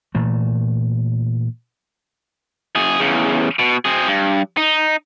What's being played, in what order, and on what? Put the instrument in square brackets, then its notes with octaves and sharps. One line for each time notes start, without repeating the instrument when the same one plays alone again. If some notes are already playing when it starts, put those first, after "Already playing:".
[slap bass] A#2 E3 A3
[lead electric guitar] F#2 G#4
E2 C#3
B2
C4 G#4
G2
D#4